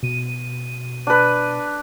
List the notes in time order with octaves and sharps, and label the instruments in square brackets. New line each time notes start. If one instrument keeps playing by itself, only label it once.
[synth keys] B2 D#7
[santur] D4 B4